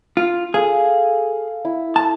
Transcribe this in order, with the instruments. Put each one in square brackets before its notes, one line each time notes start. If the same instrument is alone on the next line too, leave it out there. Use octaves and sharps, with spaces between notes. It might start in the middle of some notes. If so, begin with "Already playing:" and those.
[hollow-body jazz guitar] F4
[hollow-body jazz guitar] G#4 [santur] A4 F5
[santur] E4
[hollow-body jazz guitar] A5